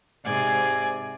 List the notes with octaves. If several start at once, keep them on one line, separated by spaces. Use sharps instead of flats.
G#2 C3 C4 D5 G#5